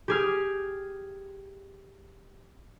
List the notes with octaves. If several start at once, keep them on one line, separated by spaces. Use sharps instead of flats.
G4 G#4 F6